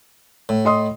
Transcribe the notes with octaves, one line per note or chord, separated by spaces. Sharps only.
A2
D#5 C6 D#6